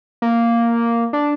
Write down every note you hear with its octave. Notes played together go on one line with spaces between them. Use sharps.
A#3
D4